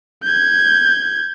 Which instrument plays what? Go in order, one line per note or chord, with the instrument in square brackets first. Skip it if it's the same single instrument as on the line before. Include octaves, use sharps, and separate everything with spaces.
[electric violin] G6 G#6